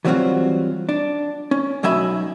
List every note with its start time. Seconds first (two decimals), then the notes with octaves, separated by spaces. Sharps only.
0.05 E3 F#3 G3 C4 F4 F#4
0.89 D4
1.51 C#4
1.83 B1 F#3 D#5 E5 G#5 B5